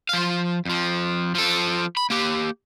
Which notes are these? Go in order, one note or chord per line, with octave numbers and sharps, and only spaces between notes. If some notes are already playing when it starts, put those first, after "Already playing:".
F3 F5
F2 F3
F3 A4
B5
A#3 G4